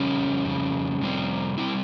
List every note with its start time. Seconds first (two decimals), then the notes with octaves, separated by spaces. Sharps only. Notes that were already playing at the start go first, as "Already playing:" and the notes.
Already playing: F2 C#3 G3 C#4
0.44 F2 C#3 G3
1.01 F2 C3 G3 C4
1.58 C3 G3 C4 E4